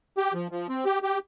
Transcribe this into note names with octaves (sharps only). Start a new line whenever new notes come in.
G4
F3
F3
C4
G4
G4